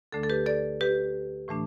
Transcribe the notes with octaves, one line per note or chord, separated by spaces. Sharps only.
D2 D3 A3 D4 A4
A4
G4 B4
A4 D5
G4 B4
A2 E3 A3 D4